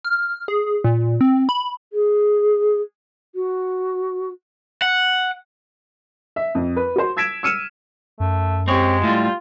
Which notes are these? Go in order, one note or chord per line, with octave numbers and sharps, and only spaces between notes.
F6
G#4
A#2
C4
B5
G#4
F#4
F#5
E5
F2
B4
F#4 C5
E6 G#6 B6 D7 E7
E6 F6 C#7 D#7 E7
F#2 A3
G#3 C4 G4 C#5
A2 G3 F4